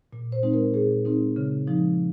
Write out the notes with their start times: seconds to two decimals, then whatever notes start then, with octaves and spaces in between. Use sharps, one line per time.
0.13 A#2
0.32 C5
0.43 G#3 C4 D#4
0.54 A#4
0.74 A#2 G#4
1.05 G#3 C4 D#4
1.36 C#3
1.67 F3 G#3 D#4